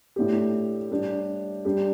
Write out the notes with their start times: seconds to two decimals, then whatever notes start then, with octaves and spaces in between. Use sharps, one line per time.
0.16 A2 A3 D4 G4
0.91 G3 D4 G4
1.65 G3 D4 G4